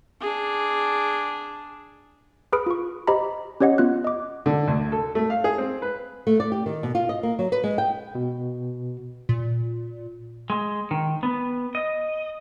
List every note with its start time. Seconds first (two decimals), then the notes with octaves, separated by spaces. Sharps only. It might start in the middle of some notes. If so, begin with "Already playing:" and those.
0.20 D4 G#4
2.52 G#4 B4 B5 D#6 F6 D7
2.66 F4 C#6
3.07 G4 C5 D#5 A#5 B5
3.60 C#4 G4 C#5 D#5 F#5
3.78 B3 F4 F#6
4.04 D#5 D6
4.46 D3
4.68 D2
4.92 A4
5.15 A3
5.30 F5
5.44 G#4
5.58 C4
5.82 B4
6.27 A3
6.40 D5
6.52 G4
6.66 D#3
6.83 B2
6.95 F4
7.09 D#5
7.23 A#3
7.39 F#3
7.52 B4
7.64 G#3
7.78 G5
8.15 B2
9.29 A#2
10.50 G#3
10.91 D#3
11.23 B3
11.75 D#5